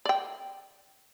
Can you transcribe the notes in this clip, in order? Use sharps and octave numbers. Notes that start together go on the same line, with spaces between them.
D5 G5